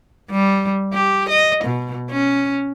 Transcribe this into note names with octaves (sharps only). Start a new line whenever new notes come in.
G3
G4
D#5
B2
C#4